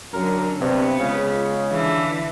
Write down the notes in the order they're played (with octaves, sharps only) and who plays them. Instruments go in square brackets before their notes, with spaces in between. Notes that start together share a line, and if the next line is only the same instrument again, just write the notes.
[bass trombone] F#2 [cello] D3 F#3 [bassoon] A#4
[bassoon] G2 [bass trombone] C3 [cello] B3
[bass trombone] C#2 [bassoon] C#3
[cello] D3 E3